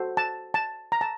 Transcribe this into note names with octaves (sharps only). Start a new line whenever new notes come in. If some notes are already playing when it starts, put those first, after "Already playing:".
Already playing: F#4 A4 C5
A5
A5
A#5
A5